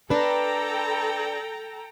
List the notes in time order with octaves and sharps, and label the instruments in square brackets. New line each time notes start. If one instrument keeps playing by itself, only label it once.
[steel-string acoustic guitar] D4 B4 [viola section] A4 G5 A#5